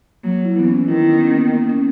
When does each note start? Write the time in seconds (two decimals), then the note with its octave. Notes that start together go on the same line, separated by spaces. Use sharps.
0.24 F#3 A#3
0.45 E4
0.56 E3 B3
0.66 C#4
0.88 D#3 E4
1.04 E4
1.13 B3
1.20 C#4
1.32 A#3
1.37 B3
1.54 A#3
1.69 C#4